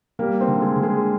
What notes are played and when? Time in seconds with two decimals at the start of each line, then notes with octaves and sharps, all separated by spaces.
0.19 G3 A#3 A#4
0.41 C4 C5
0.48 D3
0.62 G#3 G#4
0.76 D3
0.83 G#3 G#4